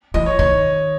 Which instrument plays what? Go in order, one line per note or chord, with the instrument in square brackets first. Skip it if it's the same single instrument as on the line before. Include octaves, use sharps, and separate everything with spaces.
[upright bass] E3 [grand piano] D#5
[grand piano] C#5
[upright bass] D#3 [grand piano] C#5